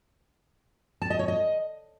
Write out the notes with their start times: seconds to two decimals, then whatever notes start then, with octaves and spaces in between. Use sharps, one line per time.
1.02 A5
1.10 D#5
1.19 C#5
1.28 D#5